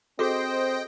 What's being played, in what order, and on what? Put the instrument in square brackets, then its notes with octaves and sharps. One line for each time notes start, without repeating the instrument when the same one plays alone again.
[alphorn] C4 [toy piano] F#4 G#4 A4 [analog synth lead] C5 [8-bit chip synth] D#5 G5